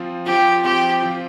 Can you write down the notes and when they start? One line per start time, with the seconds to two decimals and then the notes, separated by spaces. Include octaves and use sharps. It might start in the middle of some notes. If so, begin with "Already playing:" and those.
Already playing: F3 C4 F4
0.26 F3 C4 F4 G4
0.64 F3 C4 F4 G4
1.02 F3 C4 F4